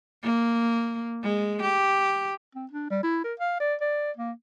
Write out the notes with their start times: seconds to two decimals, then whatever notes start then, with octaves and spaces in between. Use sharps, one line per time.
0.23 A#3
1.23 G#3
1.62 G4
2.55 C4
2.71 D4
2.90 G3
3.03 E4
3.24 A#4
3.40 F5
3.60 D5
3.81 D5
4.17 A#3